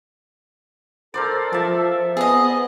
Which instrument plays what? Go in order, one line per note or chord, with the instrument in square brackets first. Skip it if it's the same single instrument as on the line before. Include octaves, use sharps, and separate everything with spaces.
[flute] A4 [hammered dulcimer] A#4 C5 D5
[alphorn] F3 [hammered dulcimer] E5 A5
[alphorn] B3 [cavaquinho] G#4 D#5 [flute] D#6